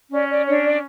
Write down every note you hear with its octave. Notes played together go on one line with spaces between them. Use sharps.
C#4 D5
D5
D4 C#5
D5